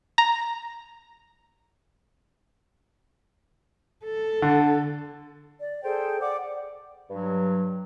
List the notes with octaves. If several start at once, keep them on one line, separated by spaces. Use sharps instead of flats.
A#5
A4
D3
D5
G#4 A4 C5 G5
D5 F#5 D6
G2 F#3